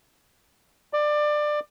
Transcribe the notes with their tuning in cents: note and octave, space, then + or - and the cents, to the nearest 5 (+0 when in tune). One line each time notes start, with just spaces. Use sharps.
D5 +20